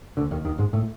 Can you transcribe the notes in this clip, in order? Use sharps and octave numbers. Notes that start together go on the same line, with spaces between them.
D2 D3
D#2 D#3
D#2 D#3
G#2 G#3
A2 A3